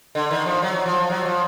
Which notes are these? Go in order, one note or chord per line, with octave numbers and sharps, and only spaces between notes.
D3
D#3
F3
F#3
F3
F#3
F3